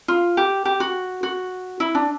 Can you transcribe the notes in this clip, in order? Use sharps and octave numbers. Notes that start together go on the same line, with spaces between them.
F4
G4
G4
F#4
F#4
E4
D4